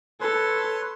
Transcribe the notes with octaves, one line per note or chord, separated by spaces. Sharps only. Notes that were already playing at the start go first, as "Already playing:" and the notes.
A4 B4 C#5 C6